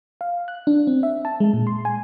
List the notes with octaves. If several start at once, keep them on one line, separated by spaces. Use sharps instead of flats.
F5
F#6
D4
C4
E5
A5
G#3
A#2
C6
G#5